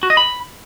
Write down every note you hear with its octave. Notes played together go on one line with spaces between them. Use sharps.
F#4
D#5
B5